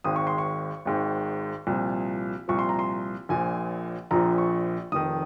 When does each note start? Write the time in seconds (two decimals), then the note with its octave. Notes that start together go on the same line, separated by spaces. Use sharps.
0.04 G#1 G#2 D#3 D#6
0.16 C#6
0.27 C6
0.38 C#6
0.85 G#1 G#2 D#3
1.67 C2 A#2 F3
2.48 C2 A#2 F3 C#6
2.59 C6
2.69 A#5
2.79 C6
3.29 A#1 A#2 F3 G#5
4.11 A#1 A#2 F3 A#5
4.38 C#6
4.92 F1 F2 D#3 D#6